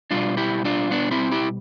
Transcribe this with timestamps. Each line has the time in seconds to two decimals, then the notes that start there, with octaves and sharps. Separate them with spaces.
0.11 B2 G3 D4 F4
0.37 E4 G4
0.65 D4 F4
0.91 B3 D4
1.11 C4 E4
1.31 E4 G4